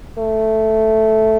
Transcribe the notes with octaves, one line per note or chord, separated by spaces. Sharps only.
A3